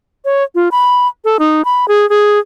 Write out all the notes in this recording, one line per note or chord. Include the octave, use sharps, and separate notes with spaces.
C#5
F4
B5
A4
D#4
B5
G#4
G#4